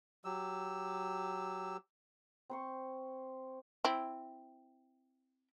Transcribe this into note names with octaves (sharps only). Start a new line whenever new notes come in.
F#3 G4 E6
C4 C5 C#6
C4 E4